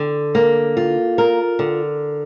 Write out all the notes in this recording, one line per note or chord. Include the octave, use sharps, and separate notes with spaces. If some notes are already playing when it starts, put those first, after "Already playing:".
Already playing: D3
A#3
F4
A#4
D3